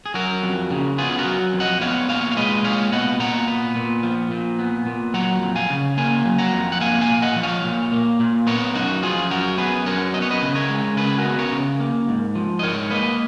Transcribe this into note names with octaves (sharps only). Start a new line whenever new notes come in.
G#4
F#3 F#4 A#4
F2
C#3
B3 F4 G#4
F#4 A#4
F#3
F2
D#5 F#5
B3 C#5 F5
A#2 C#5 F5
F5
G#3 B4 D#5
A#2 C#5 F5
B3 D#5 F#5
A#2 F#5 A#5
B3
A#2
F3
A#2
B3
A#2
F#3 F#5 A#5
F2
F5 G#5
C#3
A#3 F5 G#5
F#3
F#5 A#5
F2
F#5
A#3 F5 G#5
F5 G#5
A#2
D#5 F#5
F3
C#5 F5
A#2
A#3
A#2
B3 A#4 C#5
F#2 D#4 F#4
F3 F4 G#4
F#2 F#4 A#4
B3 G#4 B4
F#2 A#4 C#5
B3 D#5
C#5
B4 D#5
C#3
A#4 C#5
G#3
C#3 G#4 B4
F#4 A#4
B3
A#4 C#5
C#3
A#3
G#2
F3
D#5
G#2 A#4 C#5
A#3 B4 D#5